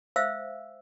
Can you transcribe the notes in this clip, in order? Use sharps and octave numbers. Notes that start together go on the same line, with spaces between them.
C5 E5 F5 E6